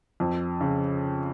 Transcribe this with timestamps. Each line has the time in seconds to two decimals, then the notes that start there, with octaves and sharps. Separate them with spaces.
0.20 F2
0.61 C#3